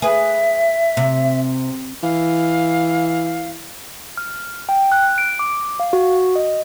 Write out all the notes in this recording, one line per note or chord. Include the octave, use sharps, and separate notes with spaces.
G#4 B4 E5
C3
E3 F5
F6
G5
F#6
D7
D6
F5
F#4
D#5